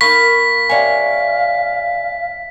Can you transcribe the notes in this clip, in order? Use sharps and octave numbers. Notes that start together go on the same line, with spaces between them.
A#3 D#4 F5 B5 C#6 B6
C3 C#5 D5 F5 G#5